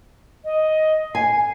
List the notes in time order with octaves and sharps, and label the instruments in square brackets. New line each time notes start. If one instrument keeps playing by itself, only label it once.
[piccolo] D#5
[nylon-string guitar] G#5 [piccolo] C7